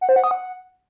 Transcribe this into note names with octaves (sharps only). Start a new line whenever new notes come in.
F#5
C5
F#5
D#6
F#5